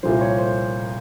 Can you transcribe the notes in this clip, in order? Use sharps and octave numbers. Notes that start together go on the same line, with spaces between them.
C2 A#2 F3 C5
C#5
C5